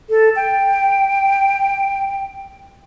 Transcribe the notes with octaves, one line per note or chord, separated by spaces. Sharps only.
A4
G5